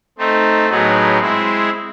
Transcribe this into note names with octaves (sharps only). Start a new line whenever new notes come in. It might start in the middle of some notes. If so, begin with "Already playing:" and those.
A3 C4 D#4
A2 F#3 B3 D#4 G#4
G#3 C4 E4 G#4